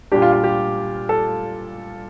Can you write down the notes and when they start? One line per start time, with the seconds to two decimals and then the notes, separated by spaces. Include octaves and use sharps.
0.12 A#2 G3 D4 G4
0.22 F4
0.33 F4
0.44 G4
1.09 A4